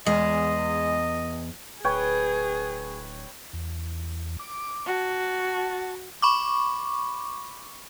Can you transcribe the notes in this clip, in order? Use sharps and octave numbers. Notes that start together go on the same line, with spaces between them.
E2 G#3 D#5
D1 G#4 B4 C#5 G5
E2
D6
F#4 A5
B5 C#6 D6